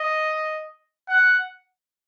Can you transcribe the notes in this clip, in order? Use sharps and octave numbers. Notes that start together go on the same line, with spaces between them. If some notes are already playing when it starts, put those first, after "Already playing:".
Already playing: D#5
F#5